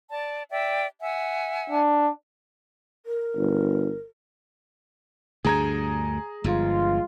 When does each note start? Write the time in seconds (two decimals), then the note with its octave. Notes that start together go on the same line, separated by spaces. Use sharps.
0.10 D5 A5
0.51 D5 E5 G5
1.01 E5 F#5 G#5
1.70 D4
3.06 A#4
3.37 G1
5.45 D2 G2 D3 G#4 A#5 G#6
6.44 G1 G2 F3 G#3 F4